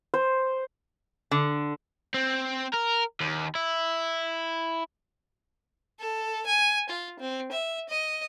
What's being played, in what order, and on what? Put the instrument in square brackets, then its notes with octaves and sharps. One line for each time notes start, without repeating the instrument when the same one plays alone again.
[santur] C5
[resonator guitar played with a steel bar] D3
[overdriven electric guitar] C4
A#4
D#2
E4
[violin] A4
G#5
F4
C4
E5
D#5